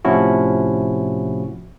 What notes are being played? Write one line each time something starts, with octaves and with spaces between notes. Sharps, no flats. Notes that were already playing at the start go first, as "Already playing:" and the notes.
A2 C3 F3 C#4 E4 F#4